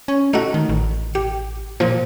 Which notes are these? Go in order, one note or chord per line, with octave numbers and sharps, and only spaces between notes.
C#4
A3 D#4 F#4
D#3
A1
G4
A#2 F3